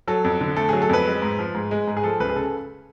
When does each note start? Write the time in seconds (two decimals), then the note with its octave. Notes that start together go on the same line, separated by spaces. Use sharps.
0.07 F#3 A4
0.24 F2
0.41 D3
0.56 A3 A4
0.69 F#3 G#4
0.82 A4
0.89 F2 B4
1.06 G#3
1.22 G#2
1.39 F3
1.55 G#2
1.71 G#3
1.88 G#2
1.97 G#4
2.04 F3 A4
2.20 C#2 B4
2.29 G#4
2.36 C#3 A4